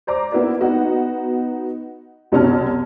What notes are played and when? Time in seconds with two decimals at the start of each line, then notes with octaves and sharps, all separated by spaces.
0.07 C5 D5 A#5 D6
0.32 A#3 B3 E4 F#4 B4 D5
0.61 B3 D#4 F#4
2.32 C2 F#2 B2 C#4 A5 F6